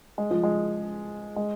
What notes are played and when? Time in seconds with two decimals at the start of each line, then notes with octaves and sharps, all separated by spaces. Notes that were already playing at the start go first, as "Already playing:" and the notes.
0.18 G#3
0.31 F3
0.44 G#3
1.36 G#3